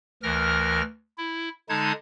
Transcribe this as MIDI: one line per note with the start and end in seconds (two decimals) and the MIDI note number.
0.23 0.82 38
0.23 0.82 52
0.23 0.82 70
0.23 0.82 89
0.23 0.82 94
1.18 1.49 64
1.69 1.92 50
1.69 1.92 56
1.69 1.92 63
1.69 1.92 81
1.69 1.92 92